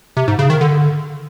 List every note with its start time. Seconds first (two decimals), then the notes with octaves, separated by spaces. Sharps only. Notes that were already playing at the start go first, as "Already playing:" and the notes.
0.17 C3
0.28 G#2
0.39 C#3
0.50 D#3
0.61 D3